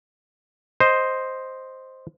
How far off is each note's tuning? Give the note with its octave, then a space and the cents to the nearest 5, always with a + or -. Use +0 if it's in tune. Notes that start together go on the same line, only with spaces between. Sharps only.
C5 +0 D#5 +0